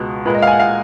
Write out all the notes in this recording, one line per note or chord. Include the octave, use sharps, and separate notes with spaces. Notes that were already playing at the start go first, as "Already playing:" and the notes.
Already playing: C#2 B2 G#3
A#2 G#3 B4
D#5
F5
G#5
F#5
F5